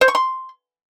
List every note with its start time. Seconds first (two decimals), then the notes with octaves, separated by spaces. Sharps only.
0.01 C5
0.08 C#6
0.15 C6